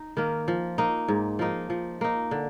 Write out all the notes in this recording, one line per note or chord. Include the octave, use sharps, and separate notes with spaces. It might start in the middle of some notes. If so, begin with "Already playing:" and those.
Already playing: D#4
D#3 A#3
F3
A#3 D#4
G#2
F3 A#3 D#4
F3
A#3 D#4
D3